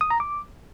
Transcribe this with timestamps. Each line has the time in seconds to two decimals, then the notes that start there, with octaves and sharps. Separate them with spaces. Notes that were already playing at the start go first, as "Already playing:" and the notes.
0.01 D#6
0.10 A#5
0.20 D6